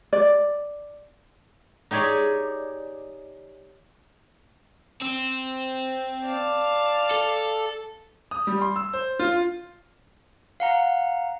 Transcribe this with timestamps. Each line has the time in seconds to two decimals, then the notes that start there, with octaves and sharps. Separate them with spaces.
0.13 D5
1.91 D#4 G4 G#4 C#5 D5
5.02 C4
6.25 D5 F5 A5
7.11 A4
8.31 D#6
8.47 G3
8.61 C6
8.76 E6
8.93 C5
9.19 F4
10.60 F5 F#5 A#5